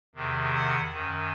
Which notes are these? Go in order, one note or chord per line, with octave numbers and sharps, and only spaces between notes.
E2 C3 D#3
F#5
F#2 D#3